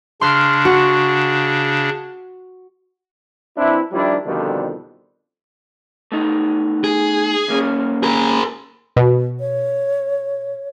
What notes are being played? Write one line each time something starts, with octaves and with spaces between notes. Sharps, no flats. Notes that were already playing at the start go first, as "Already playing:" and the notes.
C#3 D4 C6 F6
F#4
E3 C4 D4 E4
D#3 F3 G3 D4 E4
F2 B2 D3 D#3 F3 G3
A3 B3 D#4
G#4
D#2 A#3 C#4
G#4 A#4
B2
C#5